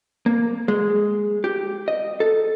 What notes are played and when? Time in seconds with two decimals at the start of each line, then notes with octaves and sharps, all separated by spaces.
0.26 A#3
0.68 G#3
1.44 G4
1.88 D#5
2.20 A4